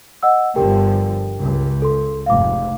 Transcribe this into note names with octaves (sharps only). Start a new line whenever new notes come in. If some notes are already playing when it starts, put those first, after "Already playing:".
D#5 F#5 E6
G1 D3 F3 G4 A#4 G5
C#2
A4 C6
F1 G#2 F5 D6